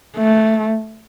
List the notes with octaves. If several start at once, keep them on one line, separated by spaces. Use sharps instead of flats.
A3